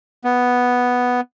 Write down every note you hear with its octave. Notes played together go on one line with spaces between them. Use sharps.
B3